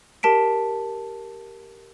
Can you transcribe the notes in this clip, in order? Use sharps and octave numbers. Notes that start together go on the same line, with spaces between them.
G4 A#4 A5 B6 D7